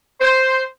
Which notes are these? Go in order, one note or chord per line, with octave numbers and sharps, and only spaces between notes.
C5